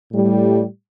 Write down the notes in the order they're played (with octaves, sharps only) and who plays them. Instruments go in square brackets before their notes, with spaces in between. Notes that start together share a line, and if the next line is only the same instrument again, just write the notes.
[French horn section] A2 G3